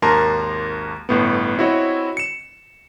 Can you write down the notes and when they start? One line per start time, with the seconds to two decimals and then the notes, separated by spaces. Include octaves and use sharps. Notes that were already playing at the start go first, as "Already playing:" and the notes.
0.02 G#1 D#2 A#4 A5 A#5 C6
1.09 G1 A2 B3
1.58 C4 E4 F#4 C#5 D#5
2.17 C#7 E7